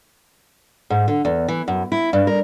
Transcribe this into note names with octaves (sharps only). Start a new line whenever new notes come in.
G#2
D3
E2
E3
F#2
E4
G2
A#4